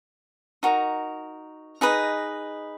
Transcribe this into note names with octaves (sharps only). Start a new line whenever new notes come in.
D#4 F#4 A#4
D#4 G#4 B4 D#5